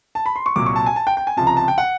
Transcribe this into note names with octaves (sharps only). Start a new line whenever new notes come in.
A5
B5
C6
C#6
C2 A#2 F#3 D6
C#6
A5
G#5
A5
G5
G5
G#5
C#2 C3 F3 A5
A#5
A5
G5
F#5